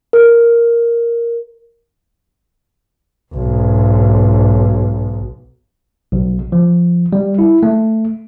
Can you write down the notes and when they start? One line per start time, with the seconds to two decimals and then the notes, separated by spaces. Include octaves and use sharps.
0.13 A#4
3.35 B1 G#2
6.12 B1
6.52 F3
7.13 G3
7.39 E4
7.63 A3